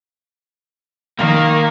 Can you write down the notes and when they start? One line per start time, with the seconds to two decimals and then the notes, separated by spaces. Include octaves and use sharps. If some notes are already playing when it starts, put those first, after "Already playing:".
1.19 D#3 A#3